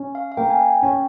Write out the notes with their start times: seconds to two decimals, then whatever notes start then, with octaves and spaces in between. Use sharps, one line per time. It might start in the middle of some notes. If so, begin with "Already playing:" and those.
Already playing: C#4
0.15 F5
0.32 F5
0.37 A#3 G5
0.50 G#5
0.60 G5
0.83 C#4